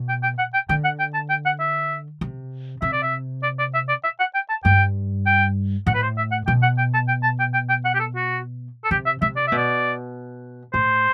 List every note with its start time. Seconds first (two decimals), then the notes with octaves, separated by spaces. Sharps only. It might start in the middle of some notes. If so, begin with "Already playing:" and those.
Already playing: B2
0.09 G5
0.23 G5
0.38 F#5
0.54 G5
0.69 D3 G5
0.84 F#5
0.99 G5
1.14 A5
1.29 G5
1.46 F#5
1.60 E5
2.21 C3
2.82 C3 E5
2.93 D5
3.03 E5
3.43 D5
3.59 D5
3.74 E5
3.89 D5
4.04 E5
4.20 F#5
4.34 G5
4.50 A5
4.64 G2 G5
5.26 G5
5.87 A2 F#5
5.94 B4
6.02 C5
6.18 E5
6.32 F#5
6.47 B2 G5
6.62 F#5
6.78 G5
6.94 A5
7.08 G5
7.23 A5
7.39 G5
7.53 G5
7.69 G5
7.85 F#5
7.95 G4
8.00 A4
8.16 F#4
8.84 A4
8.91 C3 G4
9.06 E5
9.22 C3 E5
9.37 D5
9.48 B2 E5
9.57 D5
10.73 A2 C5